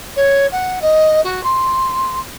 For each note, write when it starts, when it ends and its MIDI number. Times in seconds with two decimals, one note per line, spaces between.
0.16 0.46 73
0.52 0.79 78
0.81 1.20 75
1.24 1.43 66
1.44 2.19 84